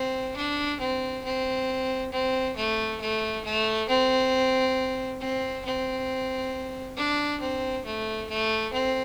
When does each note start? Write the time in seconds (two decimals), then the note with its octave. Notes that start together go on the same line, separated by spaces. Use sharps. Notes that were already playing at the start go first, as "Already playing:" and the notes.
Already playing: C4
0.36 D4
0.80 C4
1.24 C4
2.12 C4
2.57 A3
3.01 A3
3.45 A3
3.89 C4
5.20 C4
5.65 C4
6.97 D4
7.41 C4
7.86 A3
8.29 A3
8.73 C4